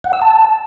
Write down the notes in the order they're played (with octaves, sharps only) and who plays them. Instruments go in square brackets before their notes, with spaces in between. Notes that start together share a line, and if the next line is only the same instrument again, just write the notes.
[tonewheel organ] F#5
E6
A5